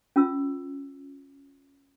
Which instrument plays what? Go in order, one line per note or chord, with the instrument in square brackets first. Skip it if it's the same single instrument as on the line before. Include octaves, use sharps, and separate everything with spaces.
[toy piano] C#4 F4 E6